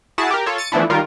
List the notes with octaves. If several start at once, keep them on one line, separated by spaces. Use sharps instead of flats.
E4 F#4 G#4 A5
G4 A#4
F4 A4 C#5
A6 C#7 D#7
E3 F3 A3 B3 D4 E4
D#3 G3 F4 A#4